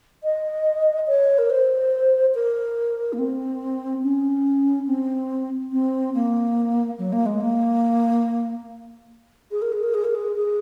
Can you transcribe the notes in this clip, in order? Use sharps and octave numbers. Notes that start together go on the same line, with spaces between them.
D#5
C#5
A#4
C5
A#4
A#3
C4
C#4
C4
C4
A#3
F#3
A#3
G#3
A#3
G#4
A#4
G#4
A#4
G#4
A#4
G#4
G#4